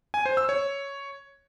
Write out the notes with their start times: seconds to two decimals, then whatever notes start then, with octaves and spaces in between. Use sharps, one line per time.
0.14 G#5
0.26 C5
0.37 E6
0.49 C#5